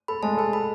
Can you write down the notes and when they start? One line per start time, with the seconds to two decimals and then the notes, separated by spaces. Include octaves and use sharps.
0.08 A4 B5
0.23 G#3 A5
0.38 A4 B5
0.53 A4 B5